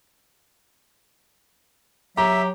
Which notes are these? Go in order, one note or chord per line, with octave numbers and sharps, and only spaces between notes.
F#3 G4 E5 A#5